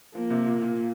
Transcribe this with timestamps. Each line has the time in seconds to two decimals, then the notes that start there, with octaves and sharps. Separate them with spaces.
0.14 F3 A#3
0.30 C3
0.46 A#2
0.62 A#2